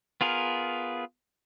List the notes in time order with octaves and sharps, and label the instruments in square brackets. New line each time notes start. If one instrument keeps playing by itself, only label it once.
[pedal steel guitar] B3 F4 G#4 A#4